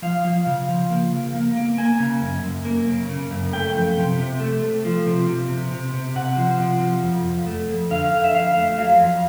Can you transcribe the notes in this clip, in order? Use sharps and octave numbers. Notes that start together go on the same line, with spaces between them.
F3 F5
F3
C#3
F3
A#3
C#3
A#3
A#3
A#3 G#5
C#3
F#2
F#2
A#3
C#3
C#3
F#2
A3 G5
F3
C3
C3
A3
A3
F3
C3
C3
C3
C3
C3
C3 F#5
F3
C3
F3
F2
F2
A3
F2
D3 F5
D3
E5
F2 F5
A3
F#3 F5
F2